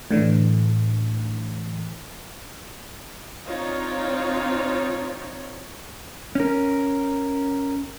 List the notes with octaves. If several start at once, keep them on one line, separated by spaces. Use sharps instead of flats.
A2 D3 E3
C4 D4 D#4 F4 C#5
C#4 A#4